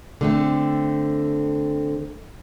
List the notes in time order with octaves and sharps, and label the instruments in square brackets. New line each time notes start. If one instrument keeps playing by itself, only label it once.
[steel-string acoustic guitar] D3 A3 C4